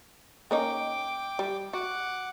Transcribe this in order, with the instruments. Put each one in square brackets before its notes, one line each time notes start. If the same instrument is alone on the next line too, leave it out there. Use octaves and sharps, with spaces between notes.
[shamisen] A#3 C#4 D#4 [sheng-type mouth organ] G5 D6
[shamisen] G3
[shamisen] F#4 [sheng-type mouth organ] F#5 D6